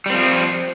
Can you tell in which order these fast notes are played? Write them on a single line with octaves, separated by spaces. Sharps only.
G3 C4 F3